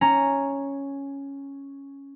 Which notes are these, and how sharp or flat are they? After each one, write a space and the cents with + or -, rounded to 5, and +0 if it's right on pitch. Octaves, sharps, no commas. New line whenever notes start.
C#4 +0 A#5 +0